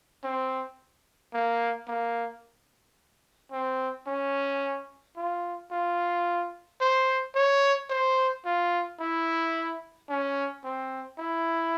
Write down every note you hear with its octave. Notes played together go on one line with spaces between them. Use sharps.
C4
A#3
A#3
C4
C#4
F4
F4
C5
C#5
C5
F4
E4
C#4
C4
E4